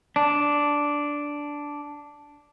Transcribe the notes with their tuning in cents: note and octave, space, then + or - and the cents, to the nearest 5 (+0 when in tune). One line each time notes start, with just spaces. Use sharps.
D4 -5